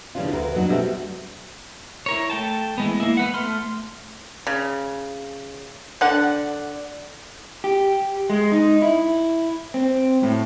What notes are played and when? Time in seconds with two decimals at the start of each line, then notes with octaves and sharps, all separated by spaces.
0.15 C#3 E3 G3 C#4 D4 F4
0.32 D2 A#4 B4
0.56 F#3 B3 D4 D#4
0.69 B2 G3 A3 B3 C4 F#4
2.06 E4 A#4 C#5
2.30 A3 G5 A5
2.78 E3 G#3 B3
3.00 A#3 E4
3.17 B3 B4 F#5
3.34 A3 C6 F6
4.47 C#3
6.01 D3 F#5
7.64 G4
8.30 G#3
8.52 D#4
8.82 E4
9.74 C4
10.23 A2